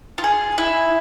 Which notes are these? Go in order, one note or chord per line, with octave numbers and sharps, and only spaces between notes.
F4
G#4
E4